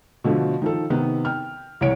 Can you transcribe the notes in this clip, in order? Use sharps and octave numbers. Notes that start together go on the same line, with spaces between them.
B2 D3 F3 A3
D#3 F3 A4
C3 D#3 B3
G5 F6
C2 E3 C#5 D7